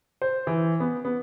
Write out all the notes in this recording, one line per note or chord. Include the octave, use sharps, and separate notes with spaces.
C5
E3
B3
B3